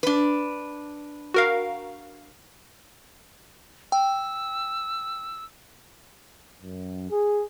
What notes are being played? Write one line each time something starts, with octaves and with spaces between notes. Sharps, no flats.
D4 B4
F#4 A#4 F5
G5 E6
F#2
G#4